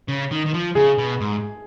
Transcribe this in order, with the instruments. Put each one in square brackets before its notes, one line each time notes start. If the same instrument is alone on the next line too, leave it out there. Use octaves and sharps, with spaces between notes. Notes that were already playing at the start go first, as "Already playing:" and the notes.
[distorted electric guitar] C#3
D#3
D#3
F3
[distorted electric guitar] C#3 [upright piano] G#4
[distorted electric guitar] B2
G#2